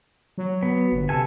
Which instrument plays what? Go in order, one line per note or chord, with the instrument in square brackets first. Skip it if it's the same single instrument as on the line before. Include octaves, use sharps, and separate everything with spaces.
[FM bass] F#3
[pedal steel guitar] B3
[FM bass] G1
[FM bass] C3 [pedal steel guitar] A4 G#5